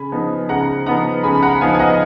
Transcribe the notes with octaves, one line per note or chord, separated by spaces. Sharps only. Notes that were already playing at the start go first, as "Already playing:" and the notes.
Already playing: C#3 G#5 B5
F3 B3 D#4
C#3 F#5 A#5
F3 B3 D#4 F#5 A#5
C#3 G#5 B5
B5
F#5 A#5
F3 B3 D#4 F5 G#5
G#5
D#5 F#5